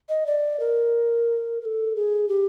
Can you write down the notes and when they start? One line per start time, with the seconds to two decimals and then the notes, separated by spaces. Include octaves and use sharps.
0.09 D#5
0.26 D5
0.60 A#4
1.61 A#4
1.65 A4
1.96 G#4
2.28 G4